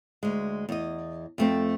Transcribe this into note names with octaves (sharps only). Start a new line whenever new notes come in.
D2 G#3
E2 D#5
F2 A3 C4